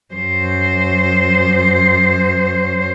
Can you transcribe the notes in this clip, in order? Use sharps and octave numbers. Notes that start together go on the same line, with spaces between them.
F#2 C5